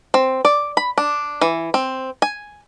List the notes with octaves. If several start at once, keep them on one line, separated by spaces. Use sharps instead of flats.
C4
D5
B5
D4
E3
C4
G#5